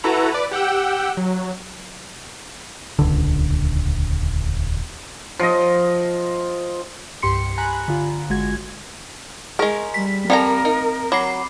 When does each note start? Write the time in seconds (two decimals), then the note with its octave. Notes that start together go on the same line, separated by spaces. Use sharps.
0.04 E4 F#4 A4 B4 A#5
0.32 B4 D5
0.51 G4 F#5 G5 E6
1.17 F#3
2.99 D#1 C#2 D3
5.39 F3 D#5
7.22 C2 G2 G4 C6 C#7
7.58 G#5 A#5 B5 F#6
7.88 D3 F4
8.29 G#1 G#3 F#4 G#6
9.59 G#3 G#4 A#4
9.94 G3 B6
10.30 G3 C4 A4 A#4 A#5
10.65 D#4
11.12 F#3 B5 D6 C7